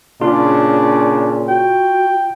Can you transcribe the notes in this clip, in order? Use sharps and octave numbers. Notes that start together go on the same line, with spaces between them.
A#2 C#3 D4 F4
F#4 G5